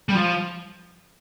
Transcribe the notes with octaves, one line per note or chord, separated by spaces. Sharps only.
G3
F3